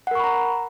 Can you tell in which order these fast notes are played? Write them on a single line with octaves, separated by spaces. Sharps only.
F#5 A#4 C#6 B5 A#5